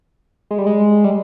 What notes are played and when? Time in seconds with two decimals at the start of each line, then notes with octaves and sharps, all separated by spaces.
0.51 G#3
0.58 G3
0.67 G#3
1.04 G3